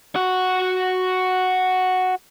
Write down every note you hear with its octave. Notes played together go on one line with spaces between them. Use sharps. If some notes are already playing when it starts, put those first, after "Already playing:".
F#4 F#5